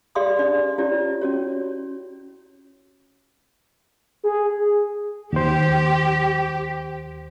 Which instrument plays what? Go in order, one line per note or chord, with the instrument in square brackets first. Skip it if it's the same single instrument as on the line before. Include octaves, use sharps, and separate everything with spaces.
[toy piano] G4 G#4 D5 F5 C6 D#6
C#4 D4 D5
C#4 E4 F4 G4 C#5 D5
C#4 F#4 C#5
[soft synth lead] G#4
[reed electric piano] D#2 C5 [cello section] G4